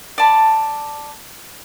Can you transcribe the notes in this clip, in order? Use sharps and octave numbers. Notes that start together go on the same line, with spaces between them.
D5 A5 B5